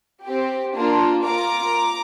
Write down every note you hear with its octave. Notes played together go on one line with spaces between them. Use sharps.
C4 G4
A#3 D4 F4
A#3 F4 A#5 D6